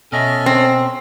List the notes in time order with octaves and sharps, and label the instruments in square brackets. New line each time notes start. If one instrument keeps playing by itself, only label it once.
[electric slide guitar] B2 D#5 E5 [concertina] C#4 A4 F6
[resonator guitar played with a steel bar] C4